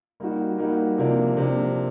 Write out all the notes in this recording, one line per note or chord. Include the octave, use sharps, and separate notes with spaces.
G3 A#3 D#4 F#4
G3 A#3 D#4 F#4
C3 F3 A#3 D4
C3 F3 A#3 D4